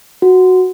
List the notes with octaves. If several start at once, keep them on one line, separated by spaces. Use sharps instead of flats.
F#4